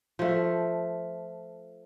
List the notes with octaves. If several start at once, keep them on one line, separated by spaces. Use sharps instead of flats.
F3 A3